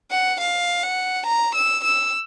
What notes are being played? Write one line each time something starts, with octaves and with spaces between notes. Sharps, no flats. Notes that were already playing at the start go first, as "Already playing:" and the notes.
F#5
F5
F#5
A#5
E6
E6